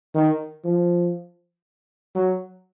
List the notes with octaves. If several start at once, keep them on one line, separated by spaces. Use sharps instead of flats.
D#3
F3
F#3